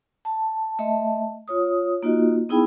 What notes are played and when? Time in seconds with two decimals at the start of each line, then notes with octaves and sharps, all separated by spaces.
0.25 A5
0.79 A3 D#5 E5 A5
1.48 F4 C#5 D#6
2.03 A#3 D#4 F4 F#4 D#5
2.49 B3 D#4 E4 G#4 G5 B5